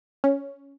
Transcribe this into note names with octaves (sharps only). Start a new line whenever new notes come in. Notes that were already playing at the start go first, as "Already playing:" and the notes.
C#4